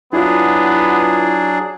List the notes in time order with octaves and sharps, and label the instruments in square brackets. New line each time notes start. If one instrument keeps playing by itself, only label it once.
[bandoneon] F#3 D4 G#4 [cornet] B3 [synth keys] E4 F4